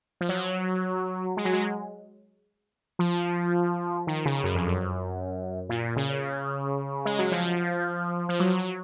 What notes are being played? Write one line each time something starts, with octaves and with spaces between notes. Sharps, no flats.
F3
F#3
G#3
F#3
G#3
F3
D#3
C#3
F#2
F2
F#2
A#2
C#3
G#3
F#3
F3
F3
F#3
F#3